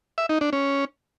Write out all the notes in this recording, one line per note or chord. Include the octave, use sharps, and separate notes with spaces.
E5
D#4
D4
C#4